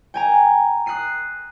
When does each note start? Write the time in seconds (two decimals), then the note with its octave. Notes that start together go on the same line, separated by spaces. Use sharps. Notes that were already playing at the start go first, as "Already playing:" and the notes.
0.14 G5 G#5 A#5
0.86 D#6 F#6 A#6 C7 D#7